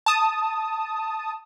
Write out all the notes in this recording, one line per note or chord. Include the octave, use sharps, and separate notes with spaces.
A5 D#6